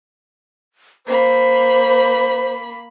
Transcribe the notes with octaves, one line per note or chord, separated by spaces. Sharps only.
A#3 C5 B5